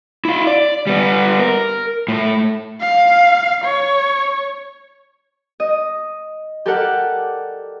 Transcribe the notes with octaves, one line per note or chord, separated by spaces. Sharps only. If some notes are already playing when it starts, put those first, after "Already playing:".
E4 F5
D5
G3 B3
A#4
A2 A3
F5
C#5
D#5
G4 A4 A#4 D5 F#5